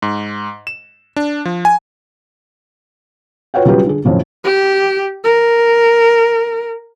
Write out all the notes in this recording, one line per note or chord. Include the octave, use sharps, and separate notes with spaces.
G#2
E7
D4
F3
G#5
F4 F#4 B4 C#5 F#5 G5
C#3 F#3 G3 F4 G4 B4
D3 G#4
F2 A2 C#3 F#3
G4
A#4